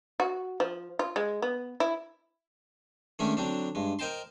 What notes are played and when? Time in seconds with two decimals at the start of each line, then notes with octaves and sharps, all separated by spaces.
0.20 F#4
0.60 F3
0.99 F4
1.16 G#3
1.42 B3
1.80 E4
3.19 D#3 G#3 A3 C#4 D4
3.37 D3 F#3 C4 D4
3.75 G2 G#3
3.99 A#4 C5 D#5 G5 A5 C6